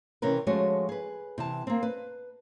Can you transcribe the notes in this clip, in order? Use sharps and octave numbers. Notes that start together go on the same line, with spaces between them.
C3 E3 C#4 A#4 B4
F3 G#3 A3 C#4 F#4 C#5
G#4 B4
C3 E3 A5
A#3 C4
B4